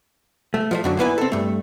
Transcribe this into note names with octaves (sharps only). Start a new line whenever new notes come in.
A3
F3 G#3 A3
F#2 D3 F#3
A#3 B3 E4 B4 D#5 G#5
C4 A4
G2 A3